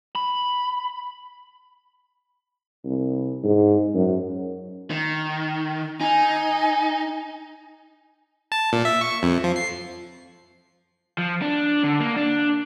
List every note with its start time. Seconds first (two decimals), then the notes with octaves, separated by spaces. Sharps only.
0.15 B5
2.84 C2
3.43 G#2
3.94 F#2
4.90 D#3
6.01 D#4 G#5
8.52 A5
8.73 A#2
8.85 E5
9.01 C#6
9.23 F2
9.44 F3
9.56 C7
11.18 F3
11.42 D4
11.83 D3
12.00 A#3
12.17 D4